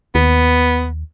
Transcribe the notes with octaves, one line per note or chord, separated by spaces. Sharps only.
D#2 B3